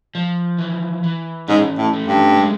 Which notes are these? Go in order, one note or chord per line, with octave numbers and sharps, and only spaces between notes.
F3
E3
E3
G#2 C#4
A2
A3
G2
G#3